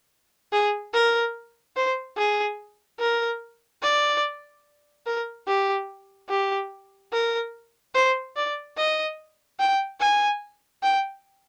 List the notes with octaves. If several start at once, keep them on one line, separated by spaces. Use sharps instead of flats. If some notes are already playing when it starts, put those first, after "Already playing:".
G#4
A#4
C5
G#4
A#4
D5
A#4
G4
G4
A#4
C5
D5
D#5
G5
G#5
G5